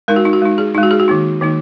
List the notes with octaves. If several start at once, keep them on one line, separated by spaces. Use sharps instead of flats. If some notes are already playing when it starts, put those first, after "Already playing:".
G#3 D#4 A#4
F#4
D#4
F#4
G#3 D#4
G#4
G#3 D#4
F#4
G#4
F#4
D#3 A#3 D#4
D#3 A#3 D#4